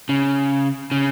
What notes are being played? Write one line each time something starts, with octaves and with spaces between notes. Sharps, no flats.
C#3
C#3